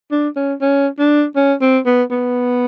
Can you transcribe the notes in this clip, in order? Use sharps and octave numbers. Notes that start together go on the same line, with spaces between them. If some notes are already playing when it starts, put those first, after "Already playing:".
D4
C#4
C#4
D4
C#4
C4
B3
B3